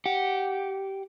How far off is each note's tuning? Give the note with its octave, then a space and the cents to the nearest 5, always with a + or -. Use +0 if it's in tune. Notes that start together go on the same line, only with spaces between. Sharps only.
G4 -15 F#5 -5